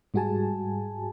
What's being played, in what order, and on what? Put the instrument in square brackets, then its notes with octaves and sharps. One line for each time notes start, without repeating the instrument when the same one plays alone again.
[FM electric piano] G#2 G3 F#4 G#4 G#5 A5